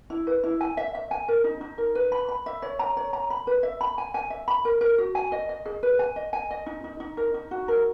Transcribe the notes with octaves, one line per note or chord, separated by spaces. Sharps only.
E4
B4
E4
G#5
E5
E5
G#5
A#4
D#4
D#4
A#4
B4
B5
B5
E5
C#5
A#5
C#5
A#5
B5
B4
E5
B5
G#5
G#5
E5
B5
A#4
A#4
F#4
G#5
D#5
D#5
G#4
B4
G#5
D#5
G#5
D#5
D#4
D#4
D#4
A#4
D#4
F#4
A#4